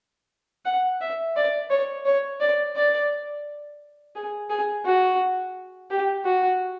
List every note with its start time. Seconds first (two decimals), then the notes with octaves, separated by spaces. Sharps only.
0.65 F#5
1.01 E5
1.36 D5
1.70 C#5
2.05 C#5
2.40 D5
2.76 D5
4.15 G#4
4.50 G#4
4.85 F#4
5.90 G4
6.25 F#4